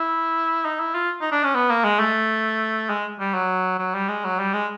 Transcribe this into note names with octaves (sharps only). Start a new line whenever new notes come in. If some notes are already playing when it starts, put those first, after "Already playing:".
Already playing: E4
D#4
E4
F4
D#4
D4
C#4
B3
A#3
G#3
A3
G#3
G3
F#3
F#3
G3
G#3
F#3
G3
G#3